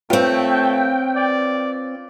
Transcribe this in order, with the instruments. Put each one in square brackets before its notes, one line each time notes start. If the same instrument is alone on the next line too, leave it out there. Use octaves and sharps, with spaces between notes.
[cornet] A3 [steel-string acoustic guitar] C4 C#5 [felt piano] F4 B4 F5 [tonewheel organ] G5
[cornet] D5